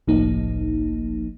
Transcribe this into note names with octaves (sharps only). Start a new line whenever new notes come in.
G1 C2 A2 F3 A#3 D#4